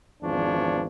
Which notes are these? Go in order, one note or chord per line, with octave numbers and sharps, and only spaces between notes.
G#1 E2 F3 D4 C#5